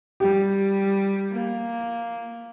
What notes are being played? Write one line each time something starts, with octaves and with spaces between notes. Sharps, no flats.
G3 G4
A#3